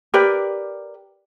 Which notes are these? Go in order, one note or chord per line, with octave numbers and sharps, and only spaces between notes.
G4 A#4 B4 D5